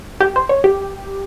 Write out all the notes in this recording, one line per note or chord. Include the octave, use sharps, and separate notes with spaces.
G4
C5
C#5
G4